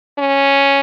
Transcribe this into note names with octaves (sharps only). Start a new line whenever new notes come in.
C#4